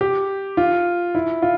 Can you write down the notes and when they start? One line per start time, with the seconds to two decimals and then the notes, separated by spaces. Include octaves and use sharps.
0.01 G4
0.57 F4
1.15 E4
1.42 F4